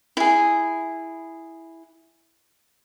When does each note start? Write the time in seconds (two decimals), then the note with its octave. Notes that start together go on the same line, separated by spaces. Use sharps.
0.17 E4 G#4